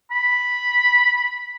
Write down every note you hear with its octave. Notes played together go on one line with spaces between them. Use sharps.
B5